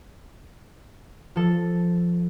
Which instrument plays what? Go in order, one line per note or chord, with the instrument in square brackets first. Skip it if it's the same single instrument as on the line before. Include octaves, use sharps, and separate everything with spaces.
[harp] F3 A4